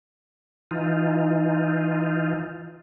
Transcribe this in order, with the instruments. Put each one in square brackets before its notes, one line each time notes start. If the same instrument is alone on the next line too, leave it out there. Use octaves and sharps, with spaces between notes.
[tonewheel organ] E3 D#4 F4